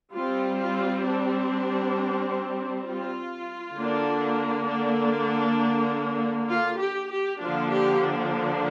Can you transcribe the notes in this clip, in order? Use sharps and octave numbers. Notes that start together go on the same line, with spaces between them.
G3 C4 F4
F4
D4
F4
D3 A#3 D4
D4
F4
G4
G4
D3 F3 A#3 D4 F4
G4
D4